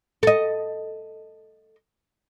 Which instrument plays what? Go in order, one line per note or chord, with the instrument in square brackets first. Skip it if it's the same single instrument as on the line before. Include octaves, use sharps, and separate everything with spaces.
[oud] A4 D#5